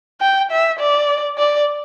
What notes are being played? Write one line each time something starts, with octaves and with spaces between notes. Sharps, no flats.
G5
E5
D5
D5